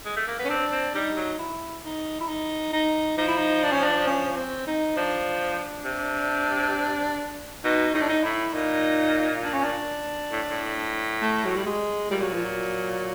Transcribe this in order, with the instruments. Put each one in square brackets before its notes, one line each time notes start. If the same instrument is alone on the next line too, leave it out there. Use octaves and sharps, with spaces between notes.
[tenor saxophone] G#3
A3
A#3
B3
[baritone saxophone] C#4
[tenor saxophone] C4 [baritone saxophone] D4
[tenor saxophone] C4
[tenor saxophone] G3 [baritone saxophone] D#4
[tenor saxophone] F#3
[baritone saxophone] E4
D#4
E4
D#4
D#4
[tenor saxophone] F3 [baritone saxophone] D#4
[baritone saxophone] E4
D#4
D4
C#4
D4
C#4
C4
D#4
[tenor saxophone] F3 [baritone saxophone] D4
[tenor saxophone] C3
[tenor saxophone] B2 [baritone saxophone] D#4
[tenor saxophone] A2 [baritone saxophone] D#4
[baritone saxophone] D4
D#4
[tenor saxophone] A2 [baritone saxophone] E4
[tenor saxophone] A#2 [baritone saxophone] D#4
[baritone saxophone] D4
C#4
D4
[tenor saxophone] A2
A2
[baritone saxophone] A3
F#3
G3
G#3
[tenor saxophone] A#2 [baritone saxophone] G3
[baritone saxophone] F#3
F3
F#3